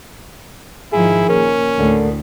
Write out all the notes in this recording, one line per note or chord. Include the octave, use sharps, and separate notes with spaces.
G#2 D#3 F3 E4 G#4
A#2 C#4 A#4
D2 A2 D3